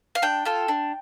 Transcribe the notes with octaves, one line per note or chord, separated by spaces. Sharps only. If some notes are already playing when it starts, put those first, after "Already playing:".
F5
D4 G5
F4 A4
D4